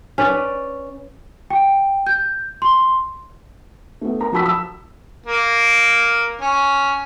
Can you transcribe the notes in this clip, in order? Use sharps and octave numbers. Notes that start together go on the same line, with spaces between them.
C#4 B4 D5
G5
G6
C6
A3 B3
A#4 A#5
F3 F#4 A5 B5 E6 B6
E6
A#3
C#4